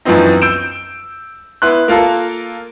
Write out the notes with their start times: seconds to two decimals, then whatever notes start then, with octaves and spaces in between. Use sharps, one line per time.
0.05 F#2 E3 F3 B3 C4 D#4
0.42 E6 G6 D7 E7
1.62 B3 E4 C6 F#6
1.88 A#3 F4 A4 A#4